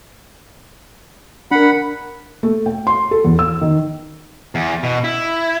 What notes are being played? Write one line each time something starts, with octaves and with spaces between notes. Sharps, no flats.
D4 A#4 F#5 B5
A3
G5
C6
A4
E2
E6
D#3
E2
B2
E4